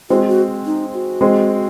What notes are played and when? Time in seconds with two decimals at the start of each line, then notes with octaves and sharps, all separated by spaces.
0.10 G#3 C4 F#4
0.28 F#4
0.66 D#4
0.94 F#4
1.21 G#3 C4